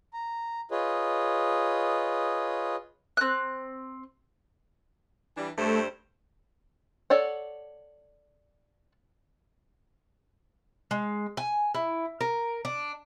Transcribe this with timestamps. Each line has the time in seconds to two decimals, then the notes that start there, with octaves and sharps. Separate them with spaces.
0.13 A#5
0.71 F4 G#4 B4 C#5 D#5
3.17 C4 F#6
5.37 E3 G3 D4
5.58 G2 G3 A3 C5
7.10 A4 C#5 D5 F#5
10.91 G#3
11.37 G#5
11.74 E4
12.21 A#4
12.65 D4